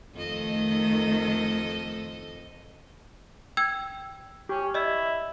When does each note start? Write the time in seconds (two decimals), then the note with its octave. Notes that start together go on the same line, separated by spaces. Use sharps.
0.15 F2 D#3 A3 A4 D#5
3.57 G5 E6 G#6
4.49 C#4 G4
4.74 E4 D5 D#5